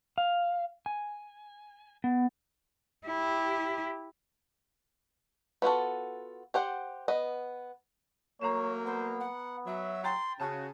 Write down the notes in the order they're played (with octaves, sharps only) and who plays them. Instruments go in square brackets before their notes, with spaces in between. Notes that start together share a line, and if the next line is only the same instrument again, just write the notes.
[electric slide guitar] F5
G#5
B3
[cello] E4 G4
[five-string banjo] B3 F4 F#4 A4
G4 C5 F#5
B3 D#5
[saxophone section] F#3 A3 A#3 [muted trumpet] C#5 [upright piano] A#5 C7 E7
[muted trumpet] B3 [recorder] C5
[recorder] F#5
[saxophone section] F#3 [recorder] E5
[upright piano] G5 A#5 A6 [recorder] C6
[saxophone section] C#3 [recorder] F#4 [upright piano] A5